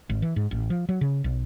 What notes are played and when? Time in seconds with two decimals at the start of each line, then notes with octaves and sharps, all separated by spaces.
0.10 G#1
0.22 E3
0.36 G#2
0.51 A1
0.70 F3
0.89 F#3
1.01 C#3
1.24 B1